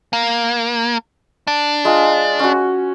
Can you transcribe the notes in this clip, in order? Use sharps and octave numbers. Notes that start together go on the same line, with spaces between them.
A#3
D4
G#3 F4
C#4 F#4